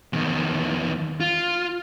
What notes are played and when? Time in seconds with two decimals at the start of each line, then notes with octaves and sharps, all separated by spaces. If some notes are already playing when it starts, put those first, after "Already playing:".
0.13 E2 D#3
1.20 F4